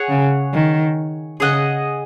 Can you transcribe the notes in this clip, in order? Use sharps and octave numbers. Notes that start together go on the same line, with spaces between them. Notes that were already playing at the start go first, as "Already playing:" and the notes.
Already playing: G#4 C#5 F#5
C#3
D#3
C#3 G#4 D#5 F#5